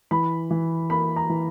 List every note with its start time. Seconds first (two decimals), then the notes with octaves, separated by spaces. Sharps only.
0.11 E3 B5
0.51 E3
0.90 A#3 B5
1.16 A#5
1.29 E3